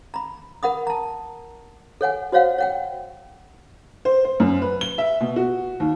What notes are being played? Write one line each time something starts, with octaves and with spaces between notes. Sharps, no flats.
A#5 B5
A#4 F#5 B5 D#6
A5 A#5
A4 C#5 F#5 G#5
F#4 C5 C#5 F5 F#5
C#5 F#5 G5
C5
C5
F#2
B4
G7
E5
B2
F#4
D#2